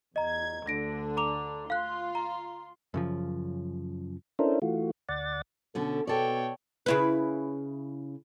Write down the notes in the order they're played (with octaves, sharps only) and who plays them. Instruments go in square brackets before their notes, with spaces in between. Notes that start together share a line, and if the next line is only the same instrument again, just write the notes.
[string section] E2 G#6 [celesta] D#5 A#5
[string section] D2 D3 D4 [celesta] A#6 D7
[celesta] A#5 D6 F7
[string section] F4 C6 [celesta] F5 F#6
[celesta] A#5
[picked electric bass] F#2 C#3 F3
[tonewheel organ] C#4 D4 E4 A4 A#4 C5
E3 A3 F4 F#4
D2 D5 F#5 A6
[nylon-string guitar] B2 D3 C#4 [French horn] A4
[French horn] B2 [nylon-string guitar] A4 D5 [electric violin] C#5 G5
[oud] C#3 E4 B4